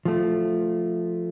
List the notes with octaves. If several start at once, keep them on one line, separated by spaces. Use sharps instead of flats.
F3 A3